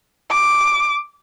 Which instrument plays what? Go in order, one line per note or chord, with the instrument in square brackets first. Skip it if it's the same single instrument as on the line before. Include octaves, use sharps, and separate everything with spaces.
[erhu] D6